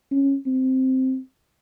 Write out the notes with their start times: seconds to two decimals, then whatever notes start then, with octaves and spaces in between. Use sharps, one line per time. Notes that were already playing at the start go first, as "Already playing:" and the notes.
0.11 C#4
0.46 C4